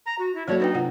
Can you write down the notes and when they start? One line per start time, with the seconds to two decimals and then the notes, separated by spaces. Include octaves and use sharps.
0.06 A#5
0.19 F#4
0.35 E4
0.48 F#3 A#3 F#4 A4 C#5 D5 E5
0.60 D4 D#4 B4 G5
0.74 C3 F4 F#5